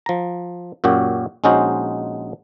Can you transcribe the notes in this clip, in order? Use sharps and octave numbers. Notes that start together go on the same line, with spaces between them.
F3 A#5
F#2 A#2 F#4 G4
A#1 G#3 C#4 D#4 F#4 C5